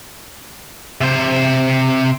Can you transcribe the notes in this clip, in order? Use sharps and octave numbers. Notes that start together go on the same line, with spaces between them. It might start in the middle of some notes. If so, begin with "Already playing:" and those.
C3 C5